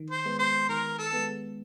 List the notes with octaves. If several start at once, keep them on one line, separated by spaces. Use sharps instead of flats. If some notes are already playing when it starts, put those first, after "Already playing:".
Already playing: D#3
C5
G#3 B3
C5
D#3 A#4
A4
G#3 B3